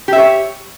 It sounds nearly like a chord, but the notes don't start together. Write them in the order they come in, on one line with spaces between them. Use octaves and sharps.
G4 E5 C#5